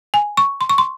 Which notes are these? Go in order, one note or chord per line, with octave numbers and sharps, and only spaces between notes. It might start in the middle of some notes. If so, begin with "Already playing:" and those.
G#5
C#6
C6
C#6
C6